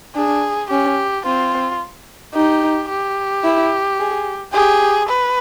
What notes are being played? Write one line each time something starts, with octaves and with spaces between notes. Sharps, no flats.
D4 G#4
C#4 G4
C4 F4
D#4 G4
G4
E4
G#4
G4 G#4
B4